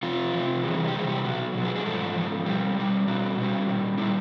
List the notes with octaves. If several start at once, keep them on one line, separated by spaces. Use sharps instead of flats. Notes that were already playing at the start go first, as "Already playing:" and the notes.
F2 C3 F3 F4
F2 C3 F3
E2 C3 E3 G3 G#4
G4
E2 C3 G3 G#4
G4
B2 F#3 F#4
B2 F#3
G#4
G#4
G#2 F3 A4
G#2 F3
B2 G3 G4
B2 G3
B2 G3 F#4
B2 G3
A#2 G3
A#2 G3 E4